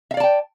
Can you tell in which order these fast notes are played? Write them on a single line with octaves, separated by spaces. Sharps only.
E5 F5 D5 A5 G5